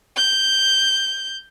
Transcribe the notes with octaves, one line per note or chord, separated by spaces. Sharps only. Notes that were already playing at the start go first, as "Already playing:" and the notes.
G6